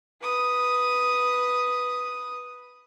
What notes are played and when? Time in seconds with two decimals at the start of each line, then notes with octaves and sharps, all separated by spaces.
0.22 B4 D#6